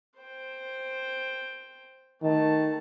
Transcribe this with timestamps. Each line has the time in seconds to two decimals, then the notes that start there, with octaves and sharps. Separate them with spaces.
0.19 C5 G5
2.22 D#3 A3 A5